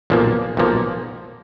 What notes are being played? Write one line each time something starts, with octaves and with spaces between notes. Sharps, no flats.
B1 A#2 F3 A#3
B1 A#2 F3 A#3